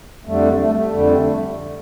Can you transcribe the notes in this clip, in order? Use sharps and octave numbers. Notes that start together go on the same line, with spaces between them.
F2 D3 G3 A3
A3
A3
F2 D3 G3